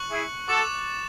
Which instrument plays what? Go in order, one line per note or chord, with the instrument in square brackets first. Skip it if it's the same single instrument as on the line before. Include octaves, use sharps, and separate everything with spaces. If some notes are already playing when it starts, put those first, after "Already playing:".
Already playing: [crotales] C#6 F#6 C#7 F#7
[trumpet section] E4 G#4
[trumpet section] F#4 A4 [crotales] D6 A6 E7